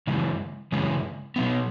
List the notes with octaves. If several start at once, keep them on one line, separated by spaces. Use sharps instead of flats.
C#3 E3 G#3
C#3 E3 G#3
B2 F#3 B3